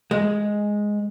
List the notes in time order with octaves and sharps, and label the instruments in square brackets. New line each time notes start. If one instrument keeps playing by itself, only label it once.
[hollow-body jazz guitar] G#3